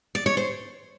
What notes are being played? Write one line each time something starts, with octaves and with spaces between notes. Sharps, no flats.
D5
C#5
C5